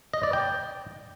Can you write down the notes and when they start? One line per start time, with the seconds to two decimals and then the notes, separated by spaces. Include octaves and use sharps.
0.13 D#5
0.23 D5
0.33 G5